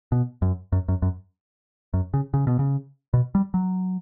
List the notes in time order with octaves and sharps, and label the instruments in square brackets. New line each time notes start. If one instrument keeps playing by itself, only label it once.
[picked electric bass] B2
F#2
F#2
F#2
F#2
F#2
C#3
C#3
B2
C#3
B2
G3
F#3